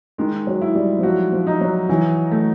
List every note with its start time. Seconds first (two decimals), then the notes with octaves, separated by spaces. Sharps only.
0.18 D#3 G#3
0.47 F#3
0.61 E4
0.75 G3
0.99 F3
1.03 F#3 F#4
1.32 F3
1.47 D#4
1.61 F#3
1.89 E3 F#3
2.31 A3